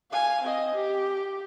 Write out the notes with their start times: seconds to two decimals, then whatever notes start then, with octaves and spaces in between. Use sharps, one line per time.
0.11 F5 G#5
0.43 C4 D#5
0.75 G4